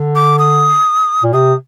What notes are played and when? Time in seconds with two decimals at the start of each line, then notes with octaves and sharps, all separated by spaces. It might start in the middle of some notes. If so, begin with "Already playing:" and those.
Already playing: D3
0.15 D6
0.39 D#6
1.23 A#2
1.33 C3 D#6